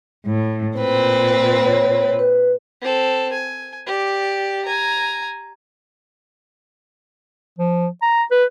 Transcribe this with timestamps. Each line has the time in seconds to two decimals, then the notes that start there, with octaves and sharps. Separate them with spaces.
0.25 A2
0.76 A#2 C4 B4
1.64 C#5
2.19 B4
2.81 C4 A4
3.32 G#5
3.87 G4 D5
4.65 G#5 A#5
7.59 F3
8.02 A#5
8.31 B4